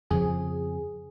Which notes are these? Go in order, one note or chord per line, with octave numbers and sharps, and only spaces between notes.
F2 C#3 F3 G#4